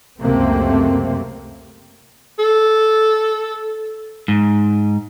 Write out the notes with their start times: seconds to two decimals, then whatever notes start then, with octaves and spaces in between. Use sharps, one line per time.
0.20 C#2 F#2 C3 A3 A#3 C4
2.39 A4
4.28 G#2